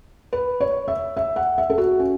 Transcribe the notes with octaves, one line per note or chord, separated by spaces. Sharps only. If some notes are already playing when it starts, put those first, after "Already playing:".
B4
C#5
E5
E5
F#5
E5
A4
F#4
C#4